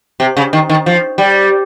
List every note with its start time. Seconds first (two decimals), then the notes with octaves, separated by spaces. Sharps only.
0.20 C3
0.37 C#3
0.53 D#3
0.70 D#3
0.86 F3
1.18 G3